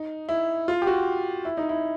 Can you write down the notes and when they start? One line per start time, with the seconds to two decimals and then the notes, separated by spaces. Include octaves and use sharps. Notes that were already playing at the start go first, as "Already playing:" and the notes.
Already playing: D#4
0.29 E4
0.68 F4
0.82 G4
0.87 F#4
1.45 E4
1.57 D#4
1.69 E4